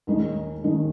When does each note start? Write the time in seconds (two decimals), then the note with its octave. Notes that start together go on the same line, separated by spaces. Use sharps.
0.07 D#2 D#3 G#3 D#4
0.64 D#2 D#3 G#3 D#4